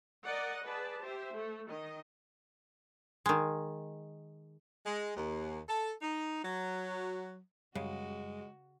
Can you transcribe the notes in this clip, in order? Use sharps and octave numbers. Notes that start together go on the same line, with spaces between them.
A#4 D5 D#5 F#5
G#4 B4 D5 A5
G4 C5 E5
A3
D#3 D#5
D#3 G#3
G#3
D#2
A4
D#4
F#3
F#2 C#3 G3 G#3 F#4